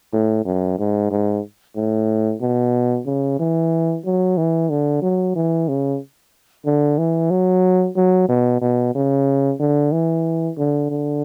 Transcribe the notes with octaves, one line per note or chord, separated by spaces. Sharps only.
A2
F#2
G#2
G#2
A2
B2
C#3
E3
F#3
E3
D3
F#3
E3
C#3
D3
E3
F#3
F#3
B2
B2
C#3
D3
E3
D3
D3